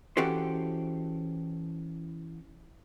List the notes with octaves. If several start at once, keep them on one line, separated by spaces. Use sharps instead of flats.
E3 C#4 F#4 G4 A4 C5